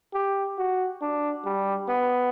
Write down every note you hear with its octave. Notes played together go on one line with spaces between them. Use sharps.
G4
F#4
D4
G3
B3